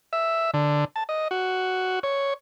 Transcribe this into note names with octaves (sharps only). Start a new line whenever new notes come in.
E5
D3
A5
D#5
F#4
C#5